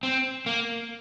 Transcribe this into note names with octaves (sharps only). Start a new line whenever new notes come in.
C4
A#3